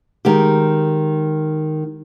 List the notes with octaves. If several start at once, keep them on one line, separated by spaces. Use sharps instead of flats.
D#3 G#3 G4